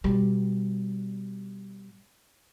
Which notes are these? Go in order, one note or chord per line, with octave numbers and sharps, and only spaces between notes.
B2 G3